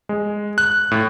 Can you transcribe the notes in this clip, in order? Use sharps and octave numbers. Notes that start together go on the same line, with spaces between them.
G#3
F#6
A2